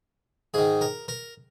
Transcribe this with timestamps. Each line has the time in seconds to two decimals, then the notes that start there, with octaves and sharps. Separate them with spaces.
0.54 G#2 D#3 G#4
0.81 A#4
1.08 A#4